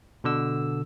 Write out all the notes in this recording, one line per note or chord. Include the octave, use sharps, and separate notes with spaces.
B2 D3 E6